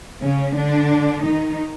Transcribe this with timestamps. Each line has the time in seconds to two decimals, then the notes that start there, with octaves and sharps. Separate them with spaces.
0.22 C#3 C#4
0.57 D3 D4
1.25 D#3 D#4